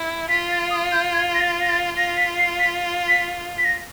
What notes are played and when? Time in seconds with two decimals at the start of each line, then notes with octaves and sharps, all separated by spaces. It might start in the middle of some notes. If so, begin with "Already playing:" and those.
Already playing: E4
0.29 F4 B6
0.51 A6
0.71 D#6
0.92 G6
1.13 G#6
1.35 A#6
1.41 A6
1.61 A#6
1.69 A6
1.97 F4 A#6
2.17 B6
2.38 C7
2.59 B6
3.08 B6
3.58 B6
3.65 A#6